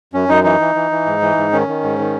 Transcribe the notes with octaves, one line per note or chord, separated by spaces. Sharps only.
F#2 C#4
F#2 D#4
E3 D#4
E3
E3
E3
G#2
E3
G#2
D#3 C#4
D#3
G#2
D#3